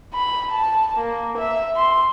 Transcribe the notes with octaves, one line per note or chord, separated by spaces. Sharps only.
B5
A5
A#3
E5
C6